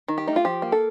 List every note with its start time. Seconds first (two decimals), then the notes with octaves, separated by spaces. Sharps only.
0.08 D#3
0.18 G4
0.27 A3 D#4
0.36 F4
0.45 F3 G4
0.62 A#3
0.72 A4